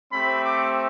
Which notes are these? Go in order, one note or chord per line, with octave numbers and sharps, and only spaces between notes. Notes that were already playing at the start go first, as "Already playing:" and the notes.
A3 C4 G4 B5
D6